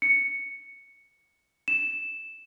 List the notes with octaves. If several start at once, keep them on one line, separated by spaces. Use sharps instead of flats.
C#7
E7